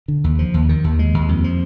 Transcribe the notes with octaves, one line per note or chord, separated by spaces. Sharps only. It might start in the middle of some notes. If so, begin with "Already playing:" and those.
D3
D#2
F3
D#2
D#3
D#2
G#3
D#2
F2
F3